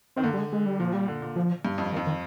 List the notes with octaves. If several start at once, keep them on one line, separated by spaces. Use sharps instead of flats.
D#3 C4
D3 A#3
G3
G#3
G#3
G3
A#2 F3
G3
D3
A#2
F3
G2
F2
D#3
F2
D#3